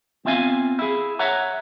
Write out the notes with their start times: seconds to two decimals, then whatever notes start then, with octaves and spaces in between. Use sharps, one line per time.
0.25 B3 C4 F4 E5 F5 G#5
0.79 E4 G#4
1.19 C#5 E5 F#5 A#5